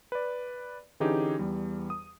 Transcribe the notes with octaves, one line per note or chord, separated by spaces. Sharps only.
B4 D5
D3 E3 C#4 D#4 G4 G#4
E2 G3
D#6